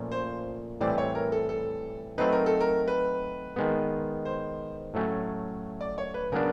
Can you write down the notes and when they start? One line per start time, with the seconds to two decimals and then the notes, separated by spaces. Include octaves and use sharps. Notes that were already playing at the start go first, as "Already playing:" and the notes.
Already playing: A#2 F3 A3 C#4
0.12 C5
0.81 A2 E3 G3 C4 D5
0.98 C#5
1.15 A#4
1.32 A4
1.49 A4
2.18 F#3 A3 C4 D#4 B4
2.32 A#4
2.46 A4
2.61 A#4
2.88 B4
3.56 D#3 G#3 B3
4.25 C5
4.94 A2 F#3 A3 C#4
5.81 D5
5.98 C#5
6.14 B4
6.32 C#3 F#3 B3 D4 A#4